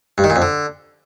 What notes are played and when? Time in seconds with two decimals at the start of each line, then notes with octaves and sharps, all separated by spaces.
0.18 G2
0.24 D#3
0.30 A#2
0.36 F2
0.42 D3